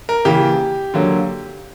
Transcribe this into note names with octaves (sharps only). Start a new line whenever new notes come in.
A#4
C#3 E3 A#3 G4
D3 F#3 A#3